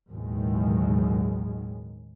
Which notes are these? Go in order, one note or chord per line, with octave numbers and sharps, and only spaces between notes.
A1 D#2 B2 D#3 F#3 G#3